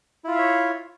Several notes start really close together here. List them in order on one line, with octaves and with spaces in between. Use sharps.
E4 F4 F5 E5 C#5